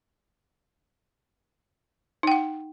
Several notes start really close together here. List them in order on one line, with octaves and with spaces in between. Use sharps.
D#4 G5 F#5